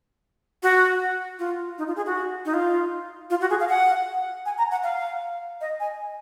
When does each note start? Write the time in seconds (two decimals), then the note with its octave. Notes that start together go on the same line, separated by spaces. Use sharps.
0.63 F#4
1.39 F4
1.78 D#4
1.87 F4
1.96 G#4
2.06 F#4
2.45 D#4
2.54 F4
3.30 F4
3.41 F#4
3.50 G#4
3.60 F5
3.69 F#5
4.46 G#5
4.58 A#5
4.71 F#5
4.83 F5
5.61 D#5
5.80 G#5